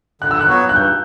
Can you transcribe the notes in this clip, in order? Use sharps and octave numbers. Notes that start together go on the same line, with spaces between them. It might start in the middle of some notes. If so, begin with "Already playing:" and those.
D3 F#6
E6
F#6
F#3 B3 F#4 C#5
G2 F#6
G6
F#6